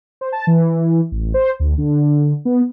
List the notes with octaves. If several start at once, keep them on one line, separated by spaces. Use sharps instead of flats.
C5
A5
E3
A1
C5
D2
D3
B3